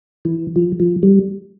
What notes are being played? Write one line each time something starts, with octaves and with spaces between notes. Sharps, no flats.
E3
F3
F3
G3